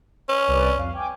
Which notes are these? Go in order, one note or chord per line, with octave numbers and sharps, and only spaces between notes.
C#4 F6
C2 B4 D5
F2 F5
G5 G#5 D6